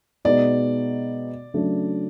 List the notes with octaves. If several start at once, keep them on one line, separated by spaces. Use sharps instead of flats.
B2 G#3 B3 D#4 F#4 D5
C#3 F#3 A3 D4